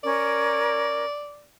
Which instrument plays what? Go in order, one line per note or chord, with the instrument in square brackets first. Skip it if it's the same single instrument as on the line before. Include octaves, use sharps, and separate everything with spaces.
[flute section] C#4 A#4 [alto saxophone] D5